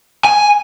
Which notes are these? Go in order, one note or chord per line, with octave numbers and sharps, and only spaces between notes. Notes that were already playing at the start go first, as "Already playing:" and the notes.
G#5